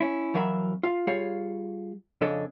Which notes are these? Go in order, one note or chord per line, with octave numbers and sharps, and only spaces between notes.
C#4 E4
F2 E3 F#3 A#4 E5 B5
F4 F5
G3 F4 G#4 C#5 F5
F2 C#3 D4 A4 C#5 D#5